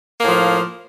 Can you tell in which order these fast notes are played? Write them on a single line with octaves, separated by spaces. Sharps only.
A#3 A2 F3